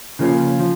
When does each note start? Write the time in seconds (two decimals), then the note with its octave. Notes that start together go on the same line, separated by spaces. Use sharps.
0.19 C#3 F3 A#3 C#4 F4
0.60 F3